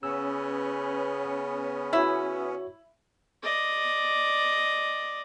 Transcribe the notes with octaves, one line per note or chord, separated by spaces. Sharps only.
C#3 B3 C#4 E6
E4 F#4 C#5
D5 D#5